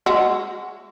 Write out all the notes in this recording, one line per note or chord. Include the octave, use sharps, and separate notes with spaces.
G#3 F#4 E5